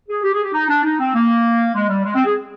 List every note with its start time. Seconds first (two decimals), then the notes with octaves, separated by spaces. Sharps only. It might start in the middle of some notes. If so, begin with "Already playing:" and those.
0.09 G#4
0.23 G4
0.33 G#4
0.44 G4
0.53 D#4
0.69 D4
0.84 D#4
0.99 C4
1.14 A#3
1.74 G#3
1.89 G3
2.04 G#3
2.14 C4
2.24 G#4